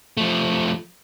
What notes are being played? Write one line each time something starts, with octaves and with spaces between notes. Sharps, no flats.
F3 A3